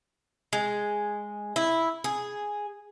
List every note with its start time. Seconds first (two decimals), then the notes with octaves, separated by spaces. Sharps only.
0.53 G#3
1.56 E4
2.04 G#4